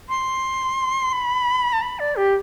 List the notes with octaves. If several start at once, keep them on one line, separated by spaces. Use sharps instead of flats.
C6
B5
A5
B5
D5
G4